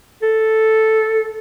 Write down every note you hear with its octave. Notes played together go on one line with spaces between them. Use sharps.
A4